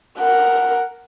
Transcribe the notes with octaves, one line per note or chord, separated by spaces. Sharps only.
A#4 F#5